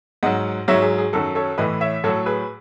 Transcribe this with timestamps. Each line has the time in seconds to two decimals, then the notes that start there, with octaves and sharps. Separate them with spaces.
0.23 G#2 F#3 D#5 F#5
0.68 G#2 F#3 C#5 E5
0.82 G#4
0.98 G#4
1.13 F#2 D#3 F#3 A4
1.35 A4 C#5
1.58 A2 E3 B4 D#5
1.81 C#5 E5
2.04 A2 F#3 A4 C#5
2.26 G#4 B4